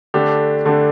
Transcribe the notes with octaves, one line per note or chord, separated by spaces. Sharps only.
D3 A3 D4 G4
D3 A3 D4 G4